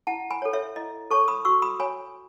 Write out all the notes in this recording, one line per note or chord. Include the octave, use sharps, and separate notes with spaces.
E4 F#5 A5
G#5 B5
C#5
A4
C#5 E5
E4 D#5
A4 C#5 A5 C#6
B5 D#6
F#4 C#6 E6
B5 D#6
C#5 G#5 B5